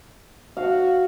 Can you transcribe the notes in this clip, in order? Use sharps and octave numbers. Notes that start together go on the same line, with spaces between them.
F#4 F5